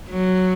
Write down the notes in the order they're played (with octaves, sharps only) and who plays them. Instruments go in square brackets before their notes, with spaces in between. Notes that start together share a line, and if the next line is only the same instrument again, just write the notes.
[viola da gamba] F#3